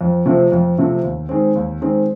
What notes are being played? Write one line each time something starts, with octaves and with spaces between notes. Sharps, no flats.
F2
C3 F3 A3 C4
F2
C3 F3 A3 C4
D#2
D#3 G#3 C4
D#2
D#3 G#3 C4